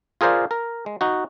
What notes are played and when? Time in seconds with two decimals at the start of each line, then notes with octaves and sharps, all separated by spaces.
0.21 F4 G#4 A#4 C5 D5 F5
0.51 A#4
0.86 G#3
1.01 D#4 F#4